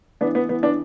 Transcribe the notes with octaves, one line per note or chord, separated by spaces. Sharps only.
E3 B3 D4
B3
E3 B3
B3 D4